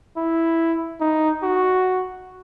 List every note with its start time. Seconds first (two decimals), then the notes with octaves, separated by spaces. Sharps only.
0.17 E4
1.00 D#4
1.43 F#4